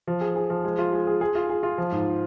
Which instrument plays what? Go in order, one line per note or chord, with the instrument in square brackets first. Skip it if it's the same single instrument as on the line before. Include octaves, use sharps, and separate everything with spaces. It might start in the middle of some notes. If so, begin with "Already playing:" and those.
[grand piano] F3
G#4
G#4
F3
G#3
F4
G#3
G#4
G#4
F4
G#4
F4
F3
G#2